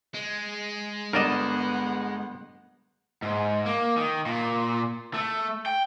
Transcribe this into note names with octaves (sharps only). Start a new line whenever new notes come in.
G#3
G1 B3 A#4 D5 D#5 F#5 E7
G#2
A#3
D#3
A#2
A3
G5